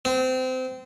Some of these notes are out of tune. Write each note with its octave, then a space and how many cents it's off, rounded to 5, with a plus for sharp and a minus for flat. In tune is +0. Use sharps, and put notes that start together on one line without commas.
C4 -25